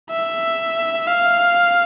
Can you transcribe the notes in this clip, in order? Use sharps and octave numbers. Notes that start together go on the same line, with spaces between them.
E5
F5